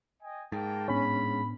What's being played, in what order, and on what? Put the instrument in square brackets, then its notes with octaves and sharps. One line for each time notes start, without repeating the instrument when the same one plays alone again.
[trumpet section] D#5 G5 G#5
[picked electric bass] G#2 [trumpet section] A#3 G5 A5
[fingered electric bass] A2 B3 D4 [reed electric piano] C#4 [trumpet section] B5